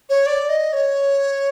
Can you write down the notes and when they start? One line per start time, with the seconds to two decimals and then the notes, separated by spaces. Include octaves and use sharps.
0.09 C#5
0.26 D5
0.49 D#5
0.73 C#5